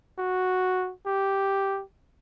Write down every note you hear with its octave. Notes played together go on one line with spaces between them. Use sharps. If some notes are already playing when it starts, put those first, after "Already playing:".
F#4
G4